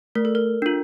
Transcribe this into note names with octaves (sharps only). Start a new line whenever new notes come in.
A3 A#4
A4
A#4
D4 F4